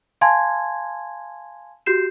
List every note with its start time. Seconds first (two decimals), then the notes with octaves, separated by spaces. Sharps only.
0.21 F5 G#5 A5 C6 G#6
1.86 F#4 G4 G6 C7 E7